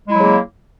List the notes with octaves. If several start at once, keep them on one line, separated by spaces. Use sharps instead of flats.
C#3 F#3 G#3 A#3 E4